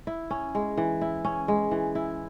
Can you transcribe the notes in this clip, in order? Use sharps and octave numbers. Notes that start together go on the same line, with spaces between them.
E4
C#4
G#3
E3
E4
C#4
G#3
E3
E4